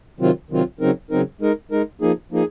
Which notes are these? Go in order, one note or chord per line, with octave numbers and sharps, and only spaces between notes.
C3 D#3 F#3 C4 F4
C3 D#3 F#3 C4 F4
C#3 F#3 C4 D#4 A#4
C#3 F#3 C4 D#4 A#4
G#3 D#4 A#4
G#3 D#4 A#4
F3 A#3 D#4 G#4
F3 A#3 D#4 G#4